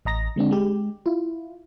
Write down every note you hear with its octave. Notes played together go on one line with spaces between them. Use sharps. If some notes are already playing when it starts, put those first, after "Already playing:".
A1 D#5 A#5 A#6
D3 G#3 C4 D4
G#3 G4
E4 F4